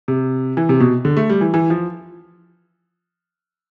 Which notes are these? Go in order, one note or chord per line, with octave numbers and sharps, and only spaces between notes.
C3
E3
C3
B2
D3
A3
G3
E3
E3
F3